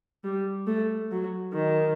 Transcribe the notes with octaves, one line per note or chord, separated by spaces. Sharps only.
G3
A3
F#3
D#3